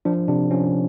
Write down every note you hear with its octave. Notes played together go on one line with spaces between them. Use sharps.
F3 D4
C3 D4
F3 C#4